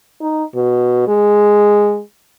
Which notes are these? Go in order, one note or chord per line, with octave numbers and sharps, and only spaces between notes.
D#4
B2
G#3